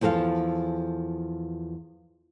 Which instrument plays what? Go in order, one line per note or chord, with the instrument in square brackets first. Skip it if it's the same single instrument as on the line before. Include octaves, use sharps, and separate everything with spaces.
[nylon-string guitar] E2 F3 A4 B4 F5